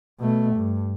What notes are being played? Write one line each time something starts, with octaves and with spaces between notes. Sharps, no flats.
B2 A3
G2